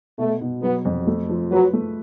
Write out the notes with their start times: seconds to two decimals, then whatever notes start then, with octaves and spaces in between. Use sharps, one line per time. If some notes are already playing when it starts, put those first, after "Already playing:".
0.18 B2 A3
0.41 B2
0.62 F#3 B3
0.85 F2
1.07 A3
1.29 F3
1.51 F#3 B4
1.73 A3